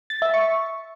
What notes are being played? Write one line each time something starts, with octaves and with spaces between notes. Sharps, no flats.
A6
E5
C#6